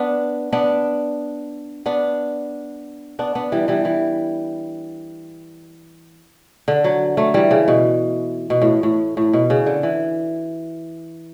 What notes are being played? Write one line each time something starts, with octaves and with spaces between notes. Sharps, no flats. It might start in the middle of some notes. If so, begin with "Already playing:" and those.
Already playing: B3 D4
B3 D4
B3 D4
B3 D4
B3 D4
E3 G3
E3 G3
E3
D3
F#3
F#3 A3
E3 G3
C#3
B2
B2
A2
A2
A2
B2
C#3
D3
E3